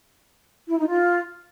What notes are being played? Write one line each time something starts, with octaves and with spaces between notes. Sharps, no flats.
E4
D#4
F4